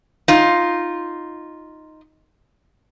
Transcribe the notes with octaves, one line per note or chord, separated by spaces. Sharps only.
D#4 F4